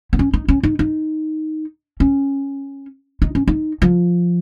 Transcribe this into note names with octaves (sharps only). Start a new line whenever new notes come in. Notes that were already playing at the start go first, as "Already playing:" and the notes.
B3
C#4
D#4
C#4
D#4
D#4
C#4
D#4
C#4
D#4
F3